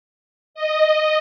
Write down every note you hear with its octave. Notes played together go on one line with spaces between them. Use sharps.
D#5